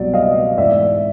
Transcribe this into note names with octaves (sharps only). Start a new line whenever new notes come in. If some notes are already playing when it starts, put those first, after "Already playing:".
Already playing: C2 B2 F#3 D5
D#5 F5
G#2 E3 D5 E5